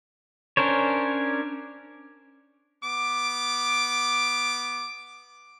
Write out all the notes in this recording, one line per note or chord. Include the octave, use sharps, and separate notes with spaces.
C#4 D4 A#4 C5 C#5
B3 D6